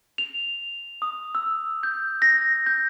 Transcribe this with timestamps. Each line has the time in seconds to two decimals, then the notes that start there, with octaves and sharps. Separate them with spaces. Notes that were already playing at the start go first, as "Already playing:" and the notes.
0.18 F7
1.02 D#6
1.35 E6
1.83 G6
2.22 A#6
2.66 G6